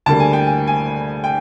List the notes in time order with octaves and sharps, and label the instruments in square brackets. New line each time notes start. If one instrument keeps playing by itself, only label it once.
[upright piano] D2 D3 G3 A#3 A5
G#5
G5
G#5
G#5
G5